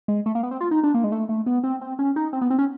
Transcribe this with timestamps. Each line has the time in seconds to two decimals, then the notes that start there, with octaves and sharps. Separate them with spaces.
0.08 G#3
0.26 A3
0.35 A#3
0.43 B3
0.51 C4
0.61 F4
0.71 D#4
0.84 D4
0.94 A#3
1.04 G#3
1.12 A3
1.29 A3
1.46 B3
1.64 C4
1.81 C4
1.99 C#4
2.16 D#4
2.33 C4
2.41 B3
2.50 C4
2.59 C#4